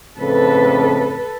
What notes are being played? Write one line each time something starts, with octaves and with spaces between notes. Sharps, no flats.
F2 A2 C#3 A4 B4